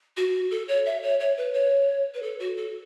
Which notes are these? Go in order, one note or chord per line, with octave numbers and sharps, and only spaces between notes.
F#4
A4
C#5
E5
C#5
C#5
B4
C#5
B4
A4
F#4
A4